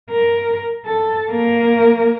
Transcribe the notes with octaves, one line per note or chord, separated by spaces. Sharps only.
A#4
A4
A#3 A#4